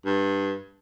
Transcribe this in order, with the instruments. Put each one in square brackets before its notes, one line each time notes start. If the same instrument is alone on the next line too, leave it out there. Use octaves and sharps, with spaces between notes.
[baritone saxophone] G2